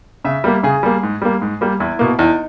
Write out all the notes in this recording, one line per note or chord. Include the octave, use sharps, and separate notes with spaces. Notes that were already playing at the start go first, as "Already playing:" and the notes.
C#3 E5
G3 A#3
C#3 G#4
G3 A#3
G#2
G3 A#3
G#2
G3 A#3
E2 E4
B2 A#3
E2 D#4